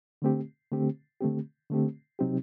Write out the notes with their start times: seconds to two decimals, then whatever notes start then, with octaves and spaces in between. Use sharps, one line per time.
0.22 D3 A3 C4 G4
0.72 D3 A3 C4 G4
1.21 D3 A3 C4 G4
1.70 D3 A3 C4 G4
2.19 C3 F#3 C4 D#4 G4